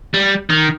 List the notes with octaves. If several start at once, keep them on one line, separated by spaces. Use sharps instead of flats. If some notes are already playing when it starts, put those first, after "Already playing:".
G3
D#3